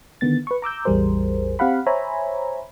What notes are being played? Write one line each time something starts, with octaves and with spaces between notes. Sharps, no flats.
D3 D#3 B3 A6
B4 C#6
A#5 D6 E6 G6
A1 E2 G3 G#4 A#4 C5
C4 G4 F5 F#5 B5
C5 C#5 E5 G#5 A#5 B5